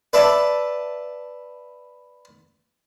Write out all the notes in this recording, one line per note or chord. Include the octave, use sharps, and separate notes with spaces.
B4 D5 E5 A5